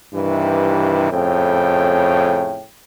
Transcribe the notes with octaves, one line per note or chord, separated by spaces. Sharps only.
G2 C3 D#3 E3
F2 A2 C#3 C#4 G5